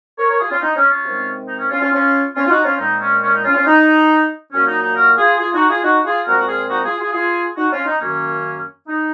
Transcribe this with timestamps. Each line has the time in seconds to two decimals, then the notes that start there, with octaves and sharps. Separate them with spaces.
0.18 A#4 C#5
0.29 A#4 C#5
0.40 F4 G#4
0.51 C#4 F4
0.62 D#4
0.76 C#4
0.90 C#4 F4
1.05 C3 D#3 G#3 C4
1.49 D#4
1.59 C#4
1.70 C#4 F4
1.81 C#4 F4
1.92 C#4 F4
2.35 C#4 F4
2.46 F4
2.50 D#4 F#4
2.64 C#4 F4
2.79 A#2 G#3 C4 D#4
3.01 C#4
3.23 C#4
3.33 D#4
3.44 C#4 F4
3.55 C#4 F4
3.66 D#4
4.53 A#2 F#3 A#3 C#4
4.67 D#4
4.82 D#4
4.96 F#4 A#4
5.18 F4 G#4
5.39 F4 G#4
5.54 D#4 F#4
5.69 F4 G#4
5.83 D#4 F#4
6.05 F4 G#4
6.26 A#2 F3 G#3 C4 F#4 A#4
6.40 F#4
6.49 F4 G#4
6.70 D#4 F#4
6.84 F4 G#4
6.99 F4 G#4
7.13 F4 G#4
7.57 D#4 F#4
7.72 C#4 F4
7.86 D#4
8.01 F#2 D#3 A#3 C#4
8.88 D#4